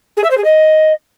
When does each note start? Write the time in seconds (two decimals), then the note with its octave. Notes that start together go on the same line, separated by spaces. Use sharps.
0.17 G#4
0.24 E5
0.31 C5
0.37 G#4
0.44 D#5